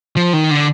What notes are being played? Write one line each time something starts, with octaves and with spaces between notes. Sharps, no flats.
F3
D#3
D3